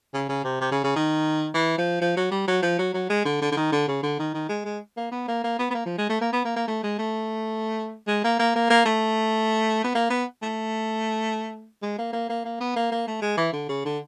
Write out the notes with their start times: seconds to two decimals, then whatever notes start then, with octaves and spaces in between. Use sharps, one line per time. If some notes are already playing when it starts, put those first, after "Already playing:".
0.14 C#3
0.29 C#3
0.44 C3
0.61 C3
0.72 C#3
0.84 C#3
0.96 D#3
1.54 E3
1.78 F3
2.01 F3
2.17 F#3
2.31 G3
2.47 F#3
2.62 F3
2.79 F#3
2.94 F#3
3.10 G#3
3.25 D3
3.41 D3
3.52 D3
3.57 D#3
3.72 D3
3.88 C#3
4.03 D3
4.19 D#3
4.34 D#3
4.49 G#3
4.65 G#3
4.97 A#3
5.11 B3
5.28 A#3
5.44 A#3
5.59 B3
5.70 B3
5.74 A#3
5.86 F3
5.98 G#3
6.10 A3
6.21 A#3
6.33 B3
6.45 A#3
6.56 A#3
6.68 A3
6.83 G#3
6.98 A3
8.08 G#3
8.24 A#3
8.39 A#3
8.55 A#3
8.70 A#3
8.85 A3
9.84 B3
9.95 A#3
10.10 B3
10.42 A3
11.82 G#3
11.98 A#3
12.13 A#3
12.29 A#3
12.45 A#3
12.60 B3
12.76 A#3
12.92 A#3
13.07 A3
13.22 G#3
13.37 E3
13.53 D3
13.69 C#3
13.85 D3